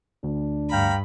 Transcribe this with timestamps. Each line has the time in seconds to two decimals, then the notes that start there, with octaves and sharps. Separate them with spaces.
0.24 D2 D4
0.71 G2 F5 G5 A#5 B5